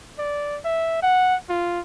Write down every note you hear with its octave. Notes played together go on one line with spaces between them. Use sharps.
D5
E5
F#5
F4